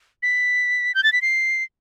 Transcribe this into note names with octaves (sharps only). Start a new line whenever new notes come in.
B6
G6
A6
B6
C7